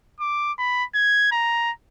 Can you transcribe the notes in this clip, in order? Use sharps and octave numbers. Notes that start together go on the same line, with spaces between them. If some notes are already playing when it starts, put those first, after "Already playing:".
D6
B5
G#6
A#5